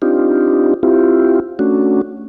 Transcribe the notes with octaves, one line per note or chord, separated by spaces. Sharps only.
C4 D4 D#4 F4 G4
C4 E4 F4 G4
A3 C#4 D4 F#4